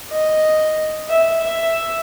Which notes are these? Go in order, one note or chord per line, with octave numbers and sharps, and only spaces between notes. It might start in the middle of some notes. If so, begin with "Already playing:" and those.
D#5
E5
E5